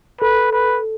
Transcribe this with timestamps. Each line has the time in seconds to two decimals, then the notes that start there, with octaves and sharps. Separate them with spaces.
0.21 A4 B4
0.53 B4